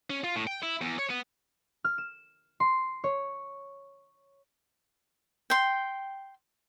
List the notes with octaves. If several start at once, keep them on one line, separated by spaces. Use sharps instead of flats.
C#4
F4
A2
G5
E4
E2
C#5
B3
F6
E7
C6
C#5
G5 C6